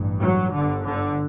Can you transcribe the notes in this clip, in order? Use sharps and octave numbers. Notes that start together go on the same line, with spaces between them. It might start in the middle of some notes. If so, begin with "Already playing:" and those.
Already playing: A1 G2
F#3
G1 G2 D3
D3